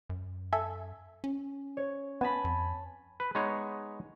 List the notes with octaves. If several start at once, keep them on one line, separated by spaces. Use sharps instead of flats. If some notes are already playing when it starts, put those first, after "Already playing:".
F#2
A4 E5 G#5
C#4
C#5
B3 G#5 A5 B5
F2
B4
G#3 B3 D#4 C#5